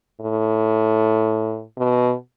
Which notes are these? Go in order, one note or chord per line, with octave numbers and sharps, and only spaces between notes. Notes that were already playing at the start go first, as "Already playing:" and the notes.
A2
B2